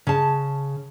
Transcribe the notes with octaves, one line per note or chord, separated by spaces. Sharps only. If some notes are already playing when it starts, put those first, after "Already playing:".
C#3 A5